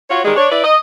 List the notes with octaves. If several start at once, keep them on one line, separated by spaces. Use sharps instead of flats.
F4 F#4 C#5
D#3 G3 G#3
D4 C#5
E4 B4 D5
D#5